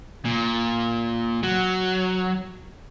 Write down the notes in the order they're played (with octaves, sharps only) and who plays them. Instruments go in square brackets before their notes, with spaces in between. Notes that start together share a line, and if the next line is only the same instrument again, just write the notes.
[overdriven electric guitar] A#2
F#3